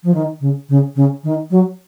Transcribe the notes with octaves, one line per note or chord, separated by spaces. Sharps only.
F3
D#3
C#3
C#3
C#3
D#3
F#3